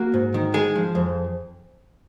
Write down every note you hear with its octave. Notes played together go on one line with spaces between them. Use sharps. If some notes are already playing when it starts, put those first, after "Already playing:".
Already playing: A#3 F#4
G#2
D#3
G#3 G#4
F3
F2